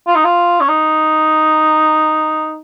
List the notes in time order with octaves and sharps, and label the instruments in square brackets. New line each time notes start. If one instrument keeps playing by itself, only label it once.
[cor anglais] F4
D#4
F4
C#4
D#4